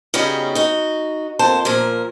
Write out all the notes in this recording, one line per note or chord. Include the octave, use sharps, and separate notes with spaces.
C#3 G3 B3 C#4 D#4 F#4
D#4 F#4
F2 A#3 C5 A5
A#2 F3 A#4